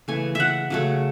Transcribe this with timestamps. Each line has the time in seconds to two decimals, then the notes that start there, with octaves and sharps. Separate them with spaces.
0.08 C#3 E3 A3 G#5
0.35 E5 F#5
0.70 C#3 F#3 A3